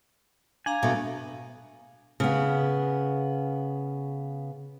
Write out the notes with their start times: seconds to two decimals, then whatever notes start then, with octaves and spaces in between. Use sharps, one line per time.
0.66 D4 F5 G#5 A#5
0.83 B2 A3
2.20 C#3 B3